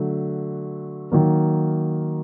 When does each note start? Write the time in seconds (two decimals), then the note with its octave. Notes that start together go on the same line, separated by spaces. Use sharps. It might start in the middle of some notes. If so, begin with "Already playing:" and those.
Already playing: D3 F#3 A3 D4
1.12 D#3 F#3 A#3